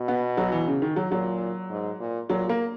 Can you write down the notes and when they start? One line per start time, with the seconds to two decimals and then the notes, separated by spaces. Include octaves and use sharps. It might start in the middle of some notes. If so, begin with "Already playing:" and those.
Already playing: B2
0.08 B3
0.37 F#3
0.52 E3
0.67 C#3
0.82 D#3
0.96 F#3
1.11 A#2 F#3
1.70 G#2
2.00 A#2
2.29 A#2 F#3
2.49 A#3